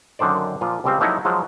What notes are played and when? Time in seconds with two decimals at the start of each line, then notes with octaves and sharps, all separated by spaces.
0.19 F#2 D3 D#3 C5 D5
0.61 A#2 F3 F4
0.84 C#2 C#3 G3 C4 C5
1.00 F3 F#3 A#3 D#4 E4 A4
1.25 F3 F#3 G#3